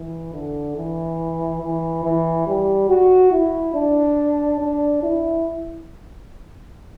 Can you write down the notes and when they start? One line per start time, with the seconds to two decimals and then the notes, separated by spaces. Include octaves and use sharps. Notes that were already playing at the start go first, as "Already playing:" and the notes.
Already playing: E3
0.33 D3
0.76 E3
1.62 E3
2.04 E3
2.47 G3
2.89 F#4
3.31 E4
3.74 D4
4.60 D4
5.03 E4